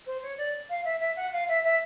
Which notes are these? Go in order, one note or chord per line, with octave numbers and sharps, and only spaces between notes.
C5
C#5
D5
F5
E5
E5
F#5
F5
E5
E5